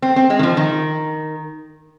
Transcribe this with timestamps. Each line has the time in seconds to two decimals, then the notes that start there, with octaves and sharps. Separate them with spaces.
0.02 C4
0.16 C4
0.30 G#3
0.39 D#3
0.43 F3
0.57 D#3